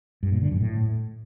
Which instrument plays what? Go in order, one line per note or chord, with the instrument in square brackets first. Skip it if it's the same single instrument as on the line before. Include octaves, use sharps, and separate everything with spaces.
[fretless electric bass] G2
A#2
D3
F#2
A2